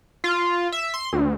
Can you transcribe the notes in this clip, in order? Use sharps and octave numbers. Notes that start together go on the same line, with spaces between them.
F4
E5
C6
D2